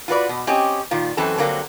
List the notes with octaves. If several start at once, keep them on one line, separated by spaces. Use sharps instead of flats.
F4 F#4 B4 D5
B2
C4 C#4 G4 D#5
A#2 D#3 F4
F#2 E3 C4 A4
D3 F#3 G3 A#3 C4